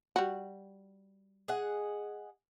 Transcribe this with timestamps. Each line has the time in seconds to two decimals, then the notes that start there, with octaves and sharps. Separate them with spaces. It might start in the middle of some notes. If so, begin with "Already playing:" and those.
0.16 G3 F#4
1.48 G#4 D#5 F#5